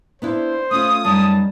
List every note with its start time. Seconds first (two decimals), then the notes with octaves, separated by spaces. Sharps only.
0.22 B3 D4 E4 C5
0.71 A3 C#4 F4 D#6
1.05 F#2 G3 D#4 A5